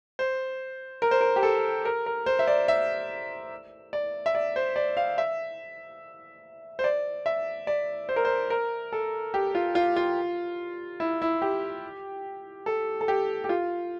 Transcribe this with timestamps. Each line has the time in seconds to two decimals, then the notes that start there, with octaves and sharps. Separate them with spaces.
0.19 C5
1.02 A#4
1.11 C5
1.21 A#4
1.36 G4
1.43 A4
1.85 A#4
2.06 A#4
2.26 C5
2.39 E5
2.47 D5
2.68 E5
3.93 D5
4.26 E5
4.35 D5
4.56 C5
4.76 D5
4.97 F5
5.18 E5
6.79 C5
6.84 D5
7.26 E5
7.67 D5
8.09 C5
8.16 A#4
8.25 C5
8.50 A#4
8.92 A4
9.34 G4
9.55 F4
9.75 F4
9.96 F4
11.00 E4
11.22 E4
11.42 G4
12.66 A4
13.01 A4
13.08 G4
13.44 G4
13.49 F4